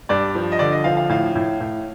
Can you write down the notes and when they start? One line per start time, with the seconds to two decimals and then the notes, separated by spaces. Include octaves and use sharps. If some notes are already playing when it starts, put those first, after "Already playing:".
0.09 G2 D5
0.35 F3
0.52 D#5
0.59 D3 D5
0.72 D#5
0.84 F3 F5
0.97 F5
1.09 A2 F5
1.35 A2
1.60 A2